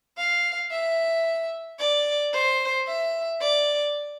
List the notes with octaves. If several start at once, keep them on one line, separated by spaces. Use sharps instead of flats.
F5
E5
D5
C5
E5
D5